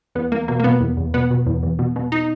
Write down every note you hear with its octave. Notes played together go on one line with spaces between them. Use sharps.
E2 B3
E2 A#3
B2 A#3
A#3
B2 B3
E2
E2
B2 B3
B2
E2
E2
B2
B2
D#4